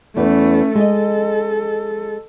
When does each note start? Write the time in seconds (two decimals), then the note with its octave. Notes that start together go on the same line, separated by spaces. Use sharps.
0.16 E2 A3 C#4 B4
0.75 G#3 A4 D#5